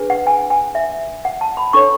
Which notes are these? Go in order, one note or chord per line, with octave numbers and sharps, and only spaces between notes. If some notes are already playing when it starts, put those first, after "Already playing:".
Already playing: D4 G#4 B4
F#5
G#5
G#5
E5
F#5
A5
B5
D4 A4 C#5 C#6